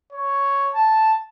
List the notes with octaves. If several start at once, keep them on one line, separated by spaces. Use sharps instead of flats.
C#5
A5